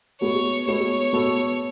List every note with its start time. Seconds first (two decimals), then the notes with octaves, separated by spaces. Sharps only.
0.21 G#3 B3 F#4 A4 C#5
0.67 G#3 B3 F#4 A4 C#5
1.13 G#3 B3 F#4 A4